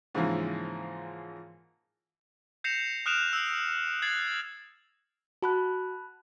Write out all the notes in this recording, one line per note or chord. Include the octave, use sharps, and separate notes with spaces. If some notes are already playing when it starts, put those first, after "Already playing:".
G#2 C#3 E3 F3 A#3
G6 A#6 C7 C#7 E7 F7
D#6 F6 F#6 D7 E7 F7
E6 C7
F#6 G#6 A6 C7 F#7
F#4 A5 B5 F#6